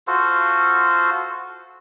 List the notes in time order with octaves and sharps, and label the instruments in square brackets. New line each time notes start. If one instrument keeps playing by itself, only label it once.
[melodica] F4 F#4 A4 C5